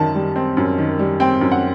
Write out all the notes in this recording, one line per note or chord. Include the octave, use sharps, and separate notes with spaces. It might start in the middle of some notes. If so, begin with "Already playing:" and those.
Already playing: F#2 D#3 A5
G3
C4
F#2
D#3
G3
C4 G5
F#2
F#5